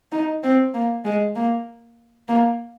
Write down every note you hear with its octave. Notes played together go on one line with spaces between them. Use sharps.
D#4
C4
A#3
G#3
A#3
A#3